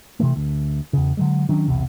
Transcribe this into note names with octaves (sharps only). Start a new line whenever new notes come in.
C3 E3 A3
D2
E2 C#3
D3 F#3 G#3
D#3 F#3 C#4 D4
B1 E2 C3